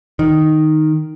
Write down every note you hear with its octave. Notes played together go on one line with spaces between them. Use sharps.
D#3